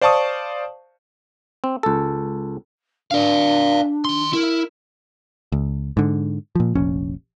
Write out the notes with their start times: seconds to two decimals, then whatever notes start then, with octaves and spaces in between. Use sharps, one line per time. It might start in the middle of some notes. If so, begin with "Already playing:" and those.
0.02 C5 D5 F5 A5 C#6 D#6
1.64 C4
1.83 C#2 A4
3.11 D4 D5 F5
4.05 D#3 C6
4.33 E4 A#4
5.52 C#2
5.97 G#2 D3
6.55 A#2 F3
6.75 F1 A#1 C#4